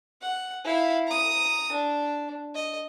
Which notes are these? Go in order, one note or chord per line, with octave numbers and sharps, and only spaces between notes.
F#5
E4 F5
A#5 D#6
D4
D#5